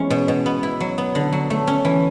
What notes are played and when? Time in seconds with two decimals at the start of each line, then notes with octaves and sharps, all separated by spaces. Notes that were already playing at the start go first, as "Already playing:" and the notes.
Already playing: E3 G#3 B3 C#4
0.10 B2
0.28 B2
0.46 B3
0.63 E4
0.80 F#3
0.98 B3
1.15 D3
1.33 F#3
1.50 A3
1.67 C#4
1.85 E3